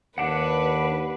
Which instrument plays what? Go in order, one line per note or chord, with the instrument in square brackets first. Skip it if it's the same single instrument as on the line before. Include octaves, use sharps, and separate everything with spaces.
[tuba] D#2 [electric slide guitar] D4 F#5 [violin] B4